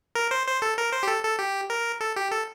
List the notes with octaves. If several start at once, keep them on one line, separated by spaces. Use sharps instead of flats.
A#4
C5
C5
A4
A#4
C5
G4
A4
A4
G4
A#4
A4
G4
A4